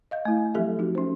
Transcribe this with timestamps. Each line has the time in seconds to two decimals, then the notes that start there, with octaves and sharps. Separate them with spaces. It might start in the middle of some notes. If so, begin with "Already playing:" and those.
0.11 D#5 F5 G6
0.25 A3 E4
0.54 F3 F#3 C4 G4 A4 E5
0.79 D#4 F#4
0.95 C#4 C5